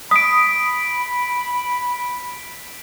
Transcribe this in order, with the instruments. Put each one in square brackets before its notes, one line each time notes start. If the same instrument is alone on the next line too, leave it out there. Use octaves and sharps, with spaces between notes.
[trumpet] B5 [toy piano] D#6 [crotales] B6 D7